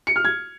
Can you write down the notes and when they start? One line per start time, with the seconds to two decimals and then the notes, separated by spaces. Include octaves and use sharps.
0.07 C#7
0.16 F6
0.25 G#6